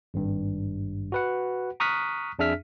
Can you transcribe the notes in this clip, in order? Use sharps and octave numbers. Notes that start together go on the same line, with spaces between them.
G#1 G2
F#4 B4 F#5
A#5 C#6 D#6 F6 F#6 B6
F2 D4 G#4 E5 F6 B6